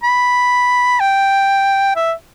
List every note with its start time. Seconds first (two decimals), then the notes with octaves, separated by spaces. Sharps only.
0.03 B5
1.00 G5
1.96 E5